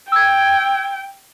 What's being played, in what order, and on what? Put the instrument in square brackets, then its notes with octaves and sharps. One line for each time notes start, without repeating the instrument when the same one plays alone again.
[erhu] G5 [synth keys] E6 G#6